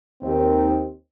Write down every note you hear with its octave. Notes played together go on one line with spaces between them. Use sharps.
D#2 C4